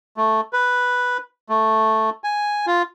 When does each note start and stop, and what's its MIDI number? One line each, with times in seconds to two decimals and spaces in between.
0.17 0.41 57
0.53 1.18 71
1.49 2.10 57
2.24 2.66 80
2.67 2.82 65